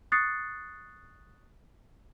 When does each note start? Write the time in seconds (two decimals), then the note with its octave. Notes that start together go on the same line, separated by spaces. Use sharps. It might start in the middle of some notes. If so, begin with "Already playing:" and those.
0.12 C#6 D#6 F#6 A6 C7 C#7